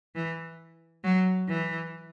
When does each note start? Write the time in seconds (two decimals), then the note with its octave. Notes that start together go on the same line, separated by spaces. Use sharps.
0.15 E3
1.04 F#3
1.48 E3